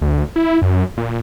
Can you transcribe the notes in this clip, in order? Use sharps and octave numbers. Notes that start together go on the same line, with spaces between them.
D2
E4
F#2
A#2